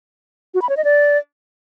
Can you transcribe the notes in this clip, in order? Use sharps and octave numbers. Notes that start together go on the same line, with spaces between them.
F#4
B5
C#5
D#5
D5